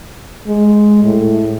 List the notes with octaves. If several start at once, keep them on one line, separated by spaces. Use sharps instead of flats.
G#3
A2